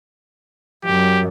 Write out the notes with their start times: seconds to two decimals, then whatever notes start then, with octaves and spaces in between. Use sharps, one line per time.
0.85 F#2 G4